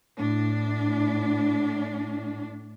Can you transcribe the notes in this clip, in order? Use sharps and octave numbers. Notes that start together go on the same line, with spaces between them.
A2 D4